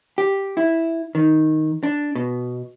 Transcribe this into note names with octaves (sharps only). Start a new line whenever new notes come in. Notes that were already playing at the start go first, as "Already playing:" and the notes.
G4
E4
D#3
D4
B2